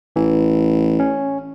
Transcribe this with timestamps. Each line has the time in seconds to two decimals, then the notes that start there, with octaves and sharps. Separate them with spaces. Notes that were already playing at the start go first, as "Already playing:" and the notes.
0.16 A1 E3
1.00 C#4